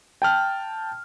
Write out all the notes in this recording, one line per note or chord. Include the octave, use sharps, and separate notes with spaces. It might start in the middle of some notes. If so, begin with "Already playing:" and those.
G5 A5 F6